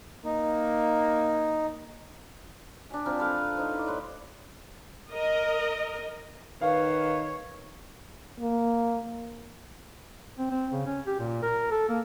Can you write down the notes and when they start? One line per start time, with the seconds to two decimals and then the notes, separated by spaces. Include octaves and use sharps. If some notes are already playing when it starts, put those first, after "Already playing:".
0.24 A#3 D#4
2.90 D4 E5 G#5
3.05 F3 C4 A#4
3.19 A4 B4 F5
3.57 D#4 C5
3.74 E4 D5
3.86 A2 B4 C6
5.12 A#4 D#5
6.61 D#3 B4 C#5 F5
8.40 A#3
10.38 C4
10.51 C4
10.72 C#3
10.86 C#4
11.07 G4
11.19 A#2
11.42 A#4
11.71 A4
11.89 A#3